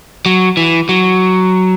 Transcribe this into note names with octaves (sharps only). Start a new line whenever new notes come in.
F#3
E3
F#3